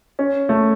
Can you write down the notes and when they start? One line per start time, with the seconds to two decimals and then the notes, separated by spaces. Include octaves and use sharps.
0.19 C#4
0.49 A3